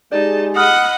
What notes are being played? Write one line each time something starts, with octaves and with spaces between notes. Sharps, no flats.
G#3 D#4 G4 G#4 D5 A5
D#5 F#5 B5 D#6 F6